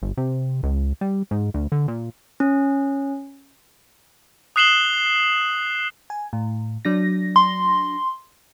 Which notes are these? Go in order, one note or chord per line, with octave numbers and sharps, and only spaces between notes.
G1
C3
C#2
G3
G#2
D2
D3
A#2
C#4
D#6 F#6 C7 E7 F#7 G7
G#5
A2
F#3 D4 A#6
C6